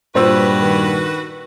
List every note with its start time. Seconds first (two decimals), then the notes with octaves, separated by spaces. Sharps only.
0.15 G2 A#2 F#4 B4 C5 E6
0.60 D#3